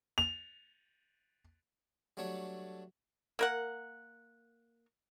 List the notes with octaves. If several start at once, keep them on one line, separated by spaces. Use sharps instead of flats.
F7
F#3 G3 A3 D4 C#5
A#3 A#4 F#5